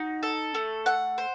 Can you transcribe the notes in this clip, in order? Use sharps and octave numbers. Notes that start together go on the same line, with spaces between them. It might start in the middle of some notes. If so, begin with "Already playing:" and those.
Already playing: D#4 F#4
A4
A3
F#5
C5